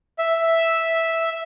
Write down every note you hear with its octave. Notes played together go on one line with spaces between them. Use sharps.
E5